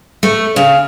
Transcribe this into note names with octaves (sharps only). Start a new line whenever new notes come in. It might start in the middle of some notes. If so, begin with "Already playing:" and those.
A3
C#3